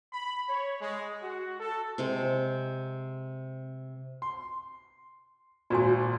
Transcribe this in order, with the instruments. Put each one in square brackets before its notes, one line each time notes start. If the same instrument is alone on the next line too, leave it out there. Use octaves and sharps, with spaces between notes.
[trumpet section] B5
C#5
G#3
F#4
A4
[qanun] C3 G#3 C4
[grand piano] C6
[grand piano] G#1 A#2 [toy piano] F4 F#4 G#5